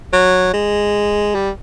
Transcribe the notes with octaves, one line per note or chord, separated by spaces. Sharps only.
F#3
G#3
G3